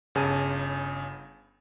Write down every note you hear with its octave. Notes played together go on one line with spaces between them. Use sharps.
G1 C#3 G#5 A5 D#7